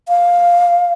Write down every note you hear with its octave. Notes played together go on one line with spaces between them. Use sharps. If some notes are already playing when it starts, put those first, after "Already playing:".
F5